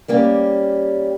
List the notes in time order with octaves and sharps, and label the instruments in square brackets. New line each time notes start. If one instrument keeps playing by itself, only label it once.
[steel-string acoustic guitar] G3 A#3 C#4 G4